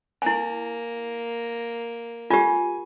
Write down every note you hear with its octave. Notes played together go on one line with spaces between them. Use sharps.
A#3 E4 G#5
F4 G4 G#5